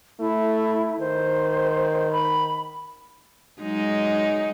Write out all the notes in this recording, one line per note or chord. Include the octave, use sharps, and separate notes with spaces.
A3 E4
D#3 C5
B5
F#3 G#3 D#4